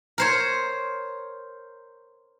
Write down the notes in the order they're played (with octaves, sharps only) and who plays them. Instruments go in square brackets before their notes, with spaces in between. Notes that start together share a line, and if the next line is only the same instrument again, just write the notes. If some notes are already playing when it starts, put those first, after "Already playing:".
[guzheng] A#4 C5 C#5